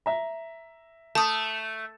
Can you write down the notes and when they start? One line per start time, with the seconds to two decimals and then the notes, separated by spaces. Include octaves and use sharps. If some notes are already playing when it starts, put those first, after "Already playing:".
0.06 E5 A#5
1.15 A3 A5 D#6